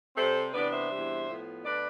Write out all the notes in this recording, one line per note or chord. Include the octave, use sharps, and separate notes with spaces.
C3 G3 C4 A4 C5
C3 E3 B3 D4 B4 D5
C5 E5
E2 C3 G3 D4
A2 F3 B3
B2 A3 D4 B4 D5